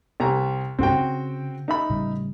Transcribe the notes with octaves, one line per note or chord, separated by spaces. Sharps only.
C2 G#5 A#5
C2 G2 C4 F#4 G5
C#3
D#4 E5 B5
A2 C#3 G3